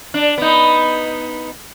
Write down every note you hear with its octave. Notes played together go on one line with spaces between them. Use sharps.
D4
B3 D#4